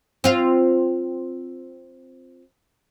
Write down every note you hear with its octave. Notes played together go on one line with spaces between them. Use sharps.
C4 F4